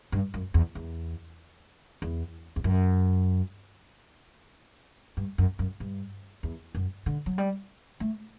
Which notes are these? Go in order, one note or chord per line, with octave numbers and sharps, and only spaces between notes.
G2
F#2
E2
E2
E2
E2
F#2
G2
F#2
F#2
G2
E2
F#2
D3
F#3
G3
A3